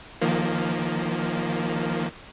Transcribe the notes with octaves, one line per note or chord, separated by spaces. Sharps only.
D#3 F3 A#3